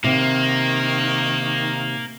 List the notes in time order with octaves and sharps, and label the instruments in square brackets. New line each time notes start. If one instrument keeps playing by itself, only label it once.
[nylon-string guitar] C3 [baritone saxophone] D#3 [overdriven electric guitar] A#3